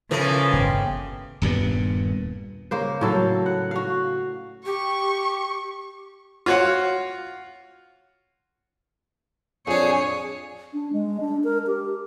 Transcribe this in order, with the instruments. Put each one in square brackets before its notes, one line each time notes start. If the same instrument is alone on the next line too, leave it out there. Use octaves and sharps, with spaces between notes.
[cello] C#3 [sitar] E3 F3 [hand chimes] A4 A#4
[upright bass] G1 [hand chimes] G5 D6
[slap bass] D#1 G2 A#2 B3
[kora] C#3 A#3 C5
A2 F#3 A4 F5
F#5
F#4 F5
[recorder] G4 [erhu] C#6
[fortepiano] F4 F#4 C#5 F5 F#5
[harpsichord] F2 D4 [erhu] G#4 [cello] C#5
[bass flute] D4
G#3
D4
A#4
G4